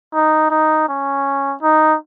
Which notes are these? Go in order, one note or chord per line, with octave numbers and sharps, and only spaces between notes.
D#4
D#4
C#4
D#4